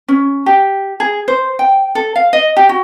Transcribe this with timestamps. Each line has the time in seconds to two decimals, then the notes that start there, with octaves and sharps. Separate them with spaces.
0.08 C#4
0.46 G4
1.00 G#4
1.28 C5
1.59 G5
1.95 A4
2.16 F5
2.33 D#5
2.57 G4
2.69 F#4